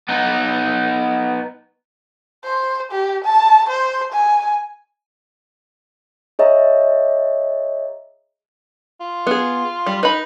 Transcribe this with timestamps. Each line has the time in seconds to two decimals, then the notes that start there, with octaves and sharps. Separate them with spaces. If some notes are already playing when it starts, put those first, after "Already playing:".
0.09 B3 D#4
2.44 C5
2.92 G4
3.24 A5
3.69 C5
4.13 G#5
6.39 G#4 C#5 D#5 E5 A#5
9.01 F4
9.27 B3 G#4
9.86 G3
10.03 D#4 B4 B5